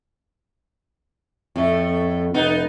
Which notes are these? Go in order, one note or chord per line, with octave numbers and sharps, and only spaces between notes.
F2 A2 A3
F1 B3 D#4